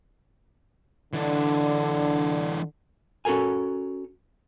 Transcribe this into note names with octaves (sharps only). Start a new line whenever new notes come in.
D3 E3 D4
C#4 F#4 A4 A#4 G#5